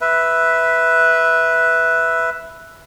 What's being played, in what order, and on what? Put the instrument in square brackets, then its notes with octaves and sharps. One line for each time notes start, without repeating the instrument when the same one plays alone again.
[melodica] B4 E5